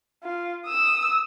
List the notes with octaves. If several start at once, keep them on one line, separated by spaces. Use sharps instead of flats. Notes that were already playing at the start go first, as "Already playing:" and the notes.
F4
D#6 E6